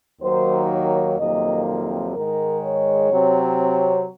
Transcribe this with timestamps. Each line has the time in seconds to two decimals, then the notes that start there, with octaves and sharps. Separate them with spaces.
0.21 D#2 D#3 F#3 A#3 C5
0.70 C#5
1.18 F2 C3 D#3 F#3 A#3 D#5
2.13 G#2 D#3 G#3 A#4
2.62 C#5
3.10 C3 F#3 C4
3.59 C#5